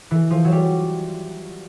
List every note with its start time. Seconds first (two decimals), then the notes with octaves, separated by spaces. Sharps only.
0.11 E3
0.30 F3
0.45 F#3
0.52 G3